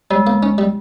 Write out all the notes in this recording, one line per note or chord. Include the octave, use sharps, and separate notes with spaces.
G3 G#3
A#3
C#4
G3